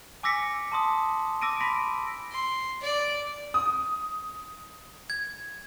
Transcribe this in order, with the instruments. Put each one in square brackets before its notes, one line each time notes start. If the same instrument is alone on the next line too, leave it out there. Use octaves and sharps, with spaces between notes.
[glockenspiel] G#5 D6 E6 A#6 B6 C#7
A5 C6 D#6
D6 E6 A#6 D7 D#7
B5 C6 A#6 B6 D7
[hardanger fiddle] C6
D5
[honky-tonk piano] D#6
[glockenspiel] G#6